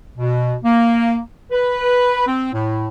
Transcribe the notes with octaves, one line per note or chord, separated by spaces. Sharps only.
B2
A#3
B4
C4
A2